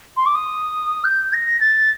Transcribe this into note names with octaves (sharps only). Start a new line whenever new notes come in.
C6
D6
D#6
G6
A#6
A6